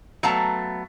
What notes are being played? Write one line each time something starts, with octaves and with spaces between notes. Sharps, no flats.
F#3 A3 B3 F5 A5 A#5